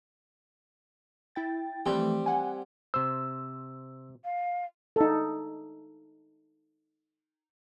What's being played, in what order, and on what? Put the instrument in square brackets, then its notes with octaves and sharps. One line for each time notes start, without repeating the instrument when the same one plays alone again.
[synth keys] E4 G5 A6
[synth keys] E3 F3 A3 [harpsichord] G3 C4 G4
[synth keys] F#5 G#5
[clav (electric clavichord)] C3 C5 [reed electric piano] E6
[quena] F5
[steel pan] D#4 A4